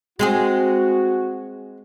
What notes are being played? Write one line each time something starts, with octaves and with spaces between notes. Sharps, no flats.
G#3 C4 F#4 G#4